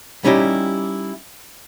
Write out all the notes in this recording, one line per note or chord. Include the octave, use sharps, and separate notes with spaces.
G3 C#4 D#4 E4 G4